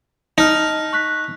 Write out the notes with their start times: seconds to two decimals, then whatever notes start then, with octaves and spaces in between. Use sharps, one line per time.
0.38 D#4 A5 F6
0.93 C#6 F#6 B6